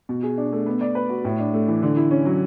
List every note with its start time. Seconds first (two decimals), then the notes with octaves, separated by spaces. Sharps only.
0.09 B2
0.23 G#4
0.38 D4
0.52 A3
0.66 B3
0.81 D5
0.95 B4
1.09 F#4
1.25 A2
1.40 D4
1.54 A3
1.68 E3
1.82 D3
1.97 E4
2.11 C#4
2.26 F#3